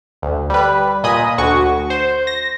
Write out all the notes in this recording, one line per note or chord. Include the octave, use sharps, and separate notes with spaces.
D2
G3 B4
A#2 D#5 G#5 B5 D#6
D2 F#4 C#6
C5
A#6